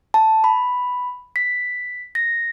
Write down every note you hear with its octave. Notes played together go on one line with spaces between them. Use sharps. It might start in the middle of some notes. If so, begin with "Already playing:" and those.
A5
B5
B6
A#6